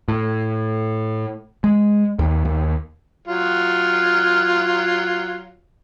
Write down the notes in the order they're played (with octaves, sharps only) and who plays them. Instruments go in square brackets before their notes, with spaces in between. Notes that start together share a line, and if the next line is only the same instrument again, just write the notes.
[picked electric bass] A2
G#3
D#2
D#2
[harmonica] F#3 F4